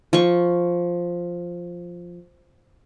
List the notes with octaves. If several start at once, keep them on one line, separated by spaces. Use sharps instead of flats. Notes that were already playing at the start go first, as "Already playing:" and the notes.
F3 C#6